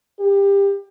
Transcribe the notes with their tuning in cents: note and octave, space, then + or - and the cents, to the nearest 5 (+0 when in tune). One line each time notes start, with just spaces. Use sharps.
G4 +25